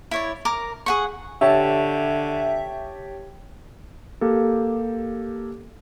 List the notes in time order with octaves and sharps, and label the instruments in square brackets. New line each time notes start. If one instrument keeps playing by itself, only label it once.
[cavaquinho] E4 C#5 D5
A#4 A#5 D6
G#4 F#5 C#6
[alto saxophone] D3 [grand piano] G4 C#5 A5 [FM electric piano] E5
[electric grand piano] A#3 G4 A4